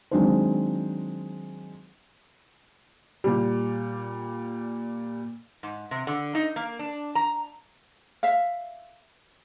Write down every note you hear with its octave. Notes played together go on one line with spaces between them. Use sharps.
D#3 F#3 G#3 C4 D4 C5
A#2 G3
G#2
C3
D3
D#4
A#3
D4
A#5
E5 F5